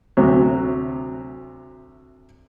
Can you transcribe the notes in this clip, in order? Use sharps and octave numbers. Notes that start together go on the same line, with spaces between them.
D2 C3 F#3